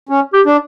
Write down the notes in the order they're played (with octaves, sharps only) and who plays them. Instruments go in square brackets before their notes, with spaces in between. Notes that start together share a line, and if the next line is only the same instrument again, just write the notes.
[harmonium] C#4
[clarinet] G4
[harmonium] D4